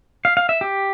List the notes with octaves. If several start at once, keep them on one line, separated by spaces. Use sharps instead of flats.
F5
F5
E5
G4